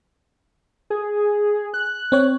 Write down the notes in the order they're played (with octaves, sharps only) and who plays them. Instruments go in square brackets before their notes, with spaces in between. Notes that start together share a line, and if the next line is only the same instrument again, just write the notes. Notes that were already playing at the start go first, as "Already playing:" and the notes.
[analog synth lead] G#4
F#6
[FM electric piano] C4 C#5